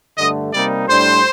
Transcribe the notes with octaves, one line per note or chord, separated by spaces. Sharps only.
G2 D3 A3 D#5
C3 G3 A#3 D#4 D5
A2 G3 D4 C5